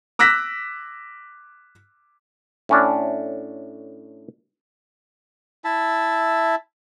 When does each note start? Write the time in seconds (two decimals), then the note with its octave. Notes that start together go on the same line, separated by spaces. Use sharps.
0.19 D6 E6 F#6 A#6 B6
2.69 A2 C#4 D4
5.65 E4 E5 A5